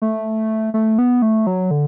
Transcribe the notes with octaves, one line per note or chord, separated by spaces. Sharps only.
A3
A3
B3
A3
F#3
D3